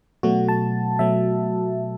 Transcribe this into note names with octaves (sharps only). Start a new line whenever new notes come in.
B2 F#3 A3 F#4
A5
B2 F#3 A3 E5